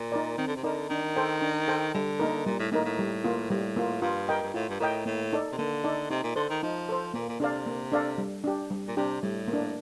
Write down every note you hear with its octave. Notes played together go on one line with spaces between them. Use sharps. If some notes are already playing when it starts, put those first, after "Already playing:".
Already playing: A#2
D#4 A#4 D5
D#3 C4
D3
C3
D3 D#4 A#4 D5
D#3 D4
A4 C5 G5
D4
A4 C5 G5
D3 G3
A#3 D#4 A#4
A#2 G3
A2
A2 A#3 D#4 A#4
A2
G3
A#3 F4
A2 G3
A#3 F4
G2 F4
A#4 D#5 G5
G2
A2 F4
G2
A2 A#4 D#5 G5
A2 A#3
D#4 A4 D5
C3
D3 A#3
D#4 A4 D5
C3 D#4
A#2
D3 A4 C5
D#3
F3 D#4
A4 C5
A#2 A#3
A#2
C3 D4 A4 D5 F5
A#3
D4 A4 D5 F5
G3
D4 G4
G3
A#2
C3 D4 G4
A2 G3
A#3
D4